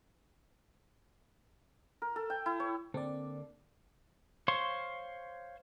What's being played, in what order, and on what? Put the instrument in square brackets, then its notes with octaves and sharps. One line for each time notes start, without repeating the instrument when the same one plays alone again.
[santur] A#4
A4
G5
E4
C#5
[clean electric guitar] D3 A#3 A4 [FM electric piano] C4 D5
[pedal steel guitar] C5 C#5 F5 C6 C#6